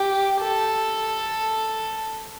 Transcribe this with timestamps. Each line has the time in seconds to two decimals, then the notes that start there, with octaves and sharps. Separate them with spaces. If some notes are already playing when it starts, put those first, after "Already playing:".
Already playing: G4
0.41 A4